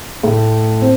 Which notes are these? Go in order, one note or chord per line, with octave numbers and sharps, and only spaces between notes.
A2 A3
C4